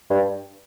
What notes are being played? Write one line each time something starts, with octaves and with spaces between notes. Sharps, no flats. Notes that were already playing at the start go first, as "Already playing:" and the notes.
G2